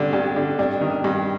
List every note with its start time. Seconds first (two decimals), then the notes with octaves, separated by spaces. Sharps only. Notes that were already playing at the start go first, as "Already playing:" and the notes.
Already playing: G2 D3
0.13 G2
0.36 D3
0.59 G2 D4
0.81 D#3
1.04 G2